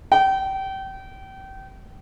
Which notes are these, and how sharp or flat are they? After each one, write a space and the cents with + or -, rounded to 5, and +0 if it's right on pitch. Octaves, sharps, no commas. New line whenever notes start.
G5 -30